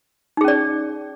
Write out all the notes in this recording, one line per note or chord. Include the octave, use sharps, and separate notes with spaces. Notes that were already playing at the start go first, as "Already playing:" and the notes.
C#4 D#4 G#4 D5